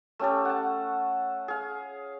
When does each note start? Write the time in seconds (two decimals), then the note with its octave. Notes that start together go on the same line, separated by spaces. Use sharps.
0.19 A3 C#4 G4 A4
0.45 F#5 A5
1.48 G#4 F5